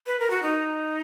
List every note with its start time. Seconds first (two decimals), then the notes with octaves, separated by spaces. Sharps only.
0.07 B4
0.20 A#4
0.30 F#4
0.43 D#4